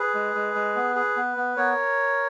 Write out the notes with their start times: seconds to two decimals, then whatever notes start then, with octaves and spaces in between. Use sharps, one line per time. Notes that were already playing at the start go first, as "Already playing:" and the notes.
Already playing: G#4 B4
0.14 G#3
0.35 G#3
0.55 G#3
0.75 B3
0.95 G#4
1.16 B3
1.37 B3
1.57 B3 A#4 C#5